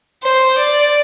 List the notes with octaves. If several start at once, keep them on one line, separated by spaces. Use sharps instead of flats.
C5
D5